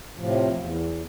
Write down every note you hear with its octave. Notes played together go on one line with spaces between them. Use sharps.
A2 C3 F3
E2